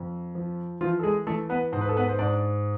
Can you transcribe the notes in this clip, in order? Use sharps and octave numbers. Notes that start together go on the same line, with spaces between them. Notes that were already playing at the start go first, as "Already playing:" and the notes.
Already playing: F2
F3
E3 F3 F4
A4
G#3 G#4
E3 A3 A4
B3 B4
G#2 C5
B4
A4
B3 B4
C5
G#2 D4 D5